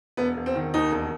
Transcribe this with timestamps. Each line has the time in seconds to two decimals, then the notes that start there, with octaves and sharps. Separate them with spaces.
0.17 E1 B3
0.37 E1
0.46 C4
0.55 D#3
0.74 D#2 D#4
0.92 E1